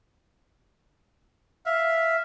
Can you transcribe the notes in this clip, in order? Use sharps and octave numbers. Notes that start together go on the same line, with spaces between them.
E5 F5